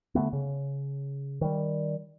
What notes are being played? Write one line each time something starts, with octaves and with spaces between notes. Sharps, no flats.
D3 D#3 A3 B3
C#3
D#3 G3